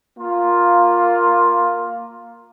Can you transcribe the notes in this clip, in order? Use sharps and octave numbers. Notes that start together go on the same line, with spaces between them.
A#3 F4